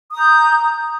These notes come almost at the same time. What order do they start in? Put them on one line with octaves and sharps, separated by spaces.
D#6 A#5 G6